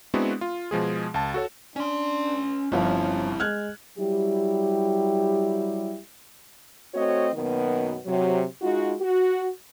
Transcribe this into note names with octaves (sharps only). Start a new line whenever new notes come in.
G#3 B3 C4 D4 E4 F#4
F4
B2 F3 G#3 G#4
C#2 A5
F#4 A4 C#5
C#4 D4 C6
G1 F3 C4 C#4 E4 F5
G#3 F6 F#6 G#6
F#3 G3 E4 G4
A3 C4 F#4 C#5 D#5
F#2 B2 D#3 A#3 B3
C3 F#3
G#3 D#4 F4 F#4
F#4